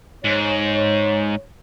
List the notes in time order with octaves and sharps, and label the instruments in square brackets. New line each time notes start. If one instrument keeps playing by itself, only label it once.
[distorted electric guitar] G#2 [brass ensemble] C#5